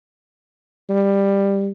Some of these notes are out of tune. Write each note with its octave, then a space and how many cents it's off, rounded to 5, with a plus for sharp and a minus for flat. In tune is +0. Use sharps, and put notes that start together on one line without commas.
G3 +15